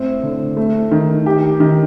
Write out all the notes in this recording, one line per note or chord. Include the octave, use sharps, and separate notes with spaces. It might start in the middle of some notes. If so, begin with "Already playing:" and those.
Already playing: A2 C4
D3
A3
D#3
G4
D#3